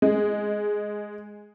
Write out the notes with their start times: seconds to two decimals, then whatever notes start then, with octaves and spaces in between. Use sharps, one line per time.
0.02 G#3